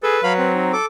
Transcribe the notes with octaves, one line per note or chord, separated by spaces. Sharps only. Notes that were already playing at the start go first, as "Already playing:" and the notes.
G#4 A4 B4
F#3 B4 F5 B5
C4
D#4
A4 D6